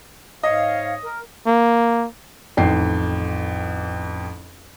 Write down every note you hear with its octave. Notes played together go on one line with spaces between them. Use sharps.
G#2 C#5 D#5 F5
A#4
A#3
A1 F2 D#3 G5 C7